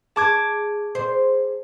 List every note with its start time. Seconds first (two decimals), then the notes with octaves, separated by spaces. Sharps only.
0.16 G#4 A5 D6 G#6
0.95 C5